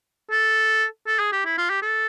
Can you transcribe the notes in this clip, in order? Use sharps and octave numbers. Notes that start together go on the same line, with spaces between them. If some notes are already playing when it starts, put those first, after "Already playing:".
A4
A4
G#4
G4
E4
F4
G4
A4